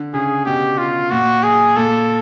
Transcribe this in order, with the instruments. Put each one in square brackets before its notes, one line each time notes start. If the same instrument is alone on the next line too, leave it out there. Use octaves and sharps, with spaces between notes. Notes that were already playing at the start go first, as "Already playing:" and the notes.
Already playing: [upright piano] D3
[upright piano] C#3 [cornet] G#4
[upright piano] B2 [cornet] G4
[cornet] F4
[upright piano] A#2 [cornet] F#4
[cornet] G#4
[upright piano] A#2 [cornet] A4